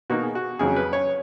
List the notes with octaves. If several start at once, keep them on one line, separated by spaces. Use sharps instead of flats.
B2 A#3 D#4 F#4
G#4
F#4
F2 C#3 F#3 G#4
B4
C#5